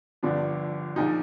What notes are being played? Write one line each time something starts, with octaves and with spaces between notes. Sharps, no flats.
G1 G2 D3 F3 D4
A#1 A#2 F3 D#4